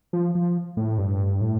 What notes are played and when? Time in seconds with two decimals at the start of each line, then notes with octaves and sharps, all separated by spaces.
0.13 F3
0.35 F3
0.77 A2
0.98 G2
1.41 A2